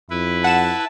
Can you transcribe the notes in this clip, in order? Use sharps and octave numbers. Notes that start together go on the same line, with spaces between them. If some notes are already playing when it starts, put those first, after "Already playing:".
F2 E4 B4
F#5 A5 E7